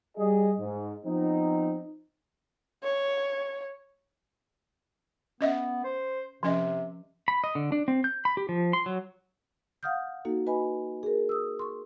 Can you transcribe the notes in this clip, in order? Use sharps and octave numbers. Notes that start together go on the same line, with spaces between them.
G3 G#4 D#5
G#2
F3 B3 C4 D#4
C#5
B3 C#4 D#5 E5
C5
C3 F3 C#4 D#5
B5
D#5
D3
D4
C4
G6
B5
G4
F3
C6
F#3
F5 F#5 D#6 F6 G6
A#3 D#4 F#4 A4
F#4 B4 D#5 G#5 B5
G#4 A#4
D#6 E6
C6 C#6